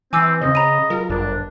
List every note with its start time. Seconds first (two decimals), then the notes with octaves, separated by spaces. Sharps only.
0.13 E3 C4 G#5 D6 E6
0.41 D#2 C#3 C4 C5 D#5
0.55 A#5 B5 D#7
0.90 F#3 F4 G#4 A#4
1.09 G1 F#2 D4 A#4